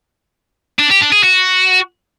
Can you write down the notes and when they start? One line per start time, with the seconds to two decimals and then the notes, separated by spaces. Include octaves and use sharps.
0.79 D4
0.90 G4
1.01 D4
1.12 G#4
1.23 F#4